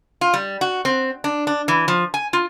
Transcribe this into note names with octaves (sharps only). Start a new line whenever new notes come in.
F4
G3
F#4
C4
D4
D4
E3
F3
G#5
F4